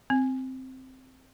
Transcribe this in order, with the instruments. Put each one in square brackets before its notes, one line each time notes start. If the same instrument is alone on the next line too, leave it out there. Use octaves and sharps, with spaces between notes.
[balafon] C4